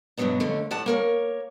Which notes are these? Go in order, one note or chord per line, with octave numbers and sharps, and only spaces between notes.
G2 B2 D3 F#3 B3 D4
F2 D3 A3 C#4
A2 D5 F#5 A5
A#3 A#4 C#5